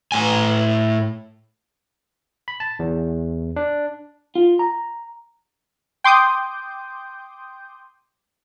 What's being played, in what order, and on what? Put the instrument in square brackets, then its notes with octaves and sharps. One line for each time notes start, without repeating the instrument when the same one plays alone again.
[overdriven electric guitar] A2 G#5
[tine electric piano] B5
A5
E2
D4
[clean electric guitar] F4
A#5
[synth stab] G5 C6 D6 D#6 G6